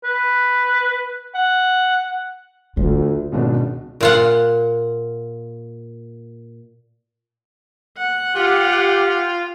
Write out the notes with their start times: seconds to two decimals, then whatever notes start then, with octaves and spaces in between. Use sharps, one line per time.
0.04 B4
1.35 F#5
2.77 D2 F4
3.32 G#1 C#2 B2 D4
4.01 A#2 F4 F#5
7.98 F#5
8.36 F4 G4